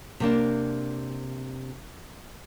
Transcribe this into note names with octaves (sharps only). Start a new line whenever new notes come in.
C3 A#3 D4